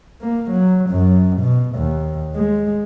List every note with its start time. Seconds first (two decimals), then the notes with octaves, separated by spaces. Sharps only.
0.22 A#3
0.50 F#3
0.90 F#2
1.41 B2
1.75 D#2
2.36 G#3